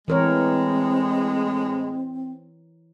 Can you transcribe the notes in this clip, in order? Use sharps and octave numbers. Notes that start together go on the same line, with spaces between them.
A2 E3 G#3 C4 A#4 C#5